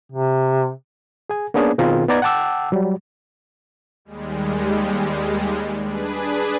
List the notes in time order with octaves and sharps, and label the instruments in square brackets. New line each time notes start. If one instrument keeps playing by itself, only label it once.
[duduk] C3
[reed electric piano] G#4 G#5
A#3 B3 C#4 D4 G#4
B2 D#3 C4 F4 G#4 A#4
B3 D#4 D5 A#5 G#6
F#5 G5 A5 D6 E6
F#3 G3
[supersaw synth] D#2 G3 G#3
D4 G#4 B4